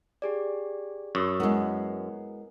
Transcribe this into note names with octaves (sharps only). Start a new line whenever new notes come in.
G4 G#4 D5
F#2 C#6 D#6 E6
G#3 B3 E4 A#4